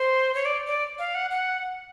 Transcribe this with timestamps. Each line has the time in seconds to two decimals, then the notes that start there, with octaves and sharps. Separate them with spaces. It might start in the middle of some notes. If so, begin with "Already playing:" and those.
Already playing: C5
0.35 C#5
0.45 D5
0.67 D5
0.99 F5
1.15 F#5
1.31 F#5